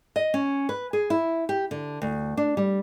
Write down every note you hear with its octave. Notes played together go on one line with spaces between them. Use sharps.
D#5
C#4
B4
G#4
E4
G4
D3
D2
D4
G3